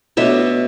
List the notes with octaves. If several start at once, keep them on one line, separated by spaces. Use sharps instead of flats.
B2 A3 D4 C#5 E5